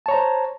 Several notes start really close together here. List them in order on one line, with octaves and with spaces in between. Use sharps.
A5 C#5 A#5 C5